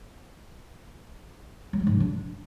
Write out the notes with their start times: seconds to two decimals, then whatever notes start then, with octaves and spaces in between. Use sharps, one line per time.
1.73 F#3
1.80 G#3
1.87 G#2
1.93 C#3
2.00 D4